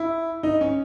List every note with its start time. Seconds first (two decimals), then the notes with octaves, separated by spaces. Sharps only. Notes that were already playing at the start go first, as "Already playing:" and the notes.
Already playing: E4
0.43 D#4
0.61 C#4